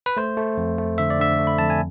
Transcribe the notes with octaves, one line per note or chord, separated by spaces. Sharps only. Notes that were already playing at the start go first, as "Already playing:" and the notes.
B4
A3 C5
A3
F2
A3
D3 E5
D5
D3 E5
A3
B5
F2 A5
G#5